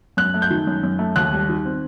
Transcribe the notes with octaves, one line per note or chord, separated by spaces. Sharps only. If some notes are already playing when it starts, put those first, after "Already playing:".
F#2 F#6
A3
G6
D#3
F#2
F#2
A3
D#2 F#6
G3
D#3
C4